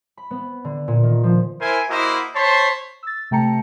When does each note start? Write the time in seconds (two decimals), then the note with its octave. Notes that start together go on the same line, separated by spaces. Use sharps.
0.17 B5
0.31 B3
0.65 D3
0.88 A#2
1.03 D#3
1.24 F3
1.61 E4 A#4 C5 G#5
1.90 A#3 E4 F#4 C5 D#5
2.35 C5 C#5 A5 B5 C6
3.03 E6 A6
3.31 C3 A3 G5 A5 A#5 C#7